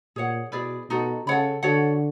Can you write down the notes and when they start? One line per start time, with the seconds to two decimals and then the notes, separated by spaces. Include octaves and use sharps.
0.16 A#2 G#4 C#5 F#5
0.52 B2 E4 G#4 B4 D5
0.90 B2 D#4 F#4 A4
1.27 C#3 A4 C#5 F#5 B5
1.63 D3 F#4 A4 C#5 F#5